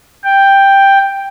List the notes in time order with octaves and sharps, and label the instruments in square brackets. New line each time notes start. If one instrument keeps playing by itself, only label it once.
[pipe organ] G5